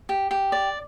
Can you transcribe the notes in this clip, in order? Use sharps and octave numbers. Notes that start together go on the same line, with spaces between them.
G4
G4
D5